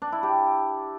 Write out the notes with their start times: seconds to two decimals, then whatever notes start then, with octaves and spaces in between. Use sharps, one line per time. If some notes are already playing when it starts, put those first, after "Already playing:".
0.02 D4
0.12 E4
0.23 G4